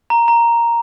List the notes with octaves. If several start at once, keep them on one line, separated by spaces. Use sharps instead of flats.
A#5
A#5